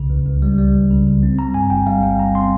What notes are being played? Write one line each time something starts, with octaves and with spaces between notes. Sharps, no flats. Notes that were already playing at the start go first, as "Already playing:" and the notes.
Already playing: C2 C#3
C#2
C#2
G3
G3
C#2
C#3
C#2
C4
G3 A#5
G2 G#5
G1 G5
G3 F5
G3 G5
G1 A#5
C4 C6